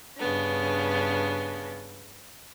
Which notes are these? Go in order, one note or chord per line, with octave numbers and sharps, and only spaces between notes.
G2 C#3 B3 D4